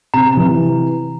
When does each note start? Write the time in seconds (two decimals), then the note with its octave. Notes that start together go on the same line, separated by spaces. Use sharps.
0.13 C3 A#5
0.37 E3